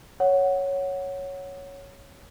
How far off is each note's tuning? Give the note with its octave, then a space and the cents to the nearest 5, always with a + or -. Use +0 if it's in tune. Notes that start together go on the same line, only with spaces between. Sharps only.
C#5 +0 F#5 +0